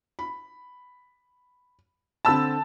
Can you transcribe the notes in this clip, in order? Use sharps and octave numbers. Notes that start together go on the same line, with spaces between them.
B5
D3 C4 A5 B5 E6